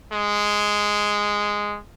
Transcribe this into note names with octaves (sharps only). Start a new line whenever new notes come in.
G#3